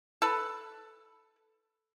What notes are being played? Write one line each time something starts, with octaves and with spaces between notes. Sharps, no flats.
A4 B4